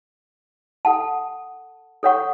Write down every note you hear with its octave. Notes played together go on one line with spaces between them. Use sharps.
A4 F#5 A5
A4 C#5 F#5 C#6